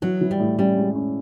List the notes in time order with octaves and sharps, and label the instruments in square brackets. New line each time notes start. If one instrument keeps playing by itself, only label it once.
[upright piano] E3 [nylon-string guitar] F#3
[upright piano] E3
[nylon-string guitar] G3
[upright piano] A2
[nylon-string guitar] G3 [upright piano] C#4
[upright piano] G#3
C#4